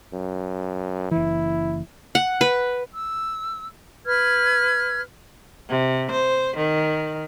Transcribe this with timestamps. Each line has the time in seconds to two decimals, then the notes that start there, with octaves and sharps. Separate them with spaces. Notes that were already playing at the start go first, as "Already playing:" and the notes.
0.13 F#2
1.11 F#1 E3 E4
2.15 F#5
2.41 B4
2.92 E6
4.07 B4 F6 G#6
5.69 C3
6.11 C5
6.57 D#3